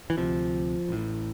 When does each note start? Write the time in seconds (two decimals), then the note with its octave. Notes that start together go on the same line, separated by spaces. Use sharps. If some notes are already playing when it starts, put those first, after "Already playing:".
0.10 E3
0.17 D2 C3 F3
0.89 A1 A2